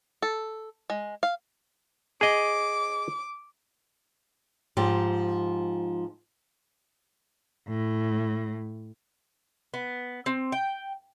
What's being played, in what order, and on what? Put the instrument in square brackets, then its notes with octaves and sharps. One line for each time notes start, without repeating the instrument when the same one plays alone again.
[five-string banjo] A4
G#3
F5
[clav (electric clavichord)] G#4 D#5 [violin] D6
[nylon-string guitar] G#2 F3 G4
[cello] A2
[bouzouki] B3
C4
G5